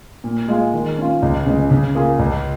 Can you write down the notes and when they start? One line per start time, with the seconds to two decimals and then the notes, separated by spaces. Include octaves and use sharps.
0.24 A#2
0.48 G#3 F4 G#4
0.74 D#3
0.98 C#4 F4
1.22 C#2
1.46 C#3 G#3
1.71 C#3
1.95 A#3 F4 G#4
2.19 C#2